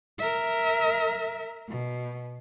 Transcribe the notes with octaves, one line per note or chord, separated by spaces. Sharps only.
A#4 E5
B2